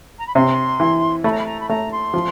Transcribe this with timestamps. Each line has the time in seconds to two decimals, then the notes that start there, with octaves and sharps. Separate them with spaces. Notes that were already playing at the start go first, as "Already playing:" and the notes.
0.19 A#5
0.27 B5
0.35 C3 C6
0.80 E3
1.24 A3 B5
1.32 A#5
1.39 B5
1.46 A#5
1.60 B5
1.69 A3 A#5
1.92 C6
2.14 F3